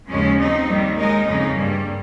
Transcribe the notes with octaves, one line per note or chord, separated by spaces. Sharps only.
D#2 C#3 F3 G#3 C#4
F3 C4 D#4
D#2 D#3 G3
G#3 D#4 A#4 D#5
F2 C#3 G#3 D#4
G2 G3 A#3